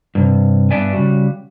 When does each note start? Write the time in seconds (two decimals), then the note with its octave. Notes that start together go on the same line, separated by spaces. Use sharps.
0.15 G2 C3
0.71 G2 B3 D4 D5 E5 G#5
0.93 C#3 G3 F#4